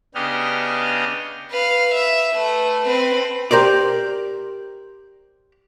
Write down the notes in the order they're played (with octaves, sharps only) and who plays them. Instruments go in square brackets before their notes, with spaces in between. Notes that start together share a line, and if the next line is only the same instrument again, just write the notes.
[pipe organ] C#3 B3 D4 G4 D#5 F6
[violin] B4 F5
E5
A3 B4
C4 B4
[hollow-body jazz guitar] G4 A#4 C5 D5